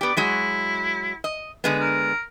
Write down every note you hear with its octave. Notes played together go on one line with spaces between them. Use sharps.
B3 G4 D5
F#3 G#3 E4 F#4
D#5
D3 G#3 B3
A#4